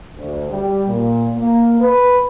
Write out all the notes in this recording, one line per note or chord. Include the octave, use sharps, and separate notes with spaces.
D2
G3
A#2
A#3
B4